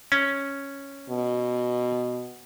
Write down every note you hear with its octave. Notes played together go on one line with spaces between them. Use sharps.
C#4
B2